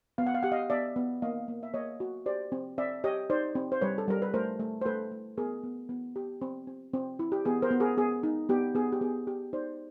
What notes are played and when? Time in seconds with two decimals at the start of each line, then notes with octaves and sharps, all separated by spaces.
0.18 B3 F5
0.27 F#5
0.35 F5
0.43 G4 F#5
0.52 D#5 F5
0.70 B3 D5 E5
0.96 B3
1.22 A#3 D#5 F5
1.48 A#3
1.63 E5
1.74 A#3 C#5 D#5
2.00 F#4
2.26 G4 C5 D5
2.52 C4
2.78 C4 D5 E5
3.04 G4 C#5 D#5
3.30 D#4 C5 D5
3.55 C4
3.72 C5
3.81 G3 B4 C#5
3.98 A4
4.08 G3 A#4
4.22 B4
4.34 A3 A#4 C5
4.60 A3
4.81 C5
4.86 A3 A4 B4
5.12 A3
5.38 B3 G#4 A#4
5.63 B3
5.89 B3
6.16 G4
6.42 C4
6.67 C4
6.93 C4
7.19 E4
7.32 G4
7.45 B3 G#4
7.62 A#4 C5
7.71 B3
7.80 G#4 A#4
7.97 B3 G#4
8.23 D#4
8.49 B3 G4
8.75 B3 G#4
8.92 G4
9.01 B3 G#4
9.27 G4
9.53 D#4 C5 D5